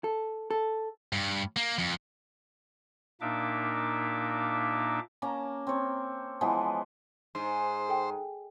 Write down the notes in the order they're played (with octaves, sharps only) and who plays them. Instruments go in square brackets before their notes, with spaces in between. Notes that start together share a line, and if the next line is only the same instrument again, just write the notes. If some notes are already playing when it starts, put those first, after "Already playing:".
[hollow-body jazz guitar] A4
A4
[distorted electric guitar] G2
A#3
F2
[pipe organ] A#2 A#3 D4 D#4 E5 D6
[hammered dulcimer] A#3 C#4 A5 A#5
C4 C#5
E3 F3 G#3 B3
[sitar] G#2 [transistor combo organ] C5
[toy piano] A4 G5